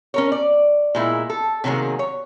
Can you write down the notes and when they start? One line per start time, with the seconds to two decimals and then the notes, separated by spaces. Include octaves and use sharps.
0.14 C#4 A#4 C#5
0.32 D5
0.95 A#2 G#3 E4
1.30 A4
1.64 C3 D#3 F#3 A#3 G#4
1.99 C#5